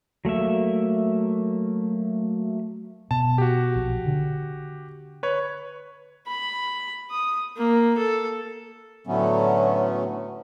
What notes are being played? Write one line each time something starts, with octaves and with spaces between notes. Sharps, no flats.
F#3 A3 A#3 E5
B2 A5
F#4 G4
A#1
D3
B4 C#5 B5
B5
D#6
A#3
A4
A2 D3 F#3 A3 B3 C#4